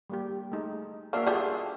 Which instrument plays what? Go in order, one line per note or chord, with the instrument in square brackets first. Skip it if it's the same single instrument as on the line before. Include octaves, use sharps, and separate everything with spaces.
[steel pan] G3 A#3 G4
A3 D#4 G#4
[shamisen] A#3 D4 [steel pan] F#4 E5 F5
[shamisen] G3 D4 [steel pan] F4 G#4 A4